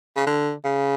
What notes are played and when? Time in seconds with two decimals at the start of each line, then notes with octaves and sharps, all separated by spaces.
0.16 C#3
0.27 D3
0.65 C#3